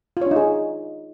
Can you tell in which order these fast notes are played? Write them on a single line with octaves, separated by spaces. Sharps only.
F4 C#5 D4 D#4 G#4